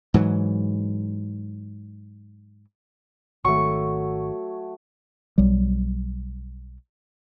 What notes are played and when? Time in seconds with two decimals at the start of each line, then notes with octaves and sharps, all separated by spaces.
0.14 G#2 E3 F#3
3.44 G#1 D#3 F#3 A3 C#6
5.38 B1 F#3 G3